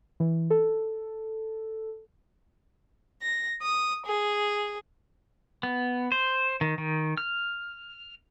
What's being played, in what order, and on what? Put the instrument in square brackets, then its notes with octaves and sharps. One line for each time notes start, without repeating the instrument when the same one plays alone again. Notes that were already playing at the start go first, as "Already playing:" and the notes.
[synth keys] E3
A4
[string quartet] A#6
D#6
G#4
[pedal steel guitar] B3
C5
D#3
D#3
F6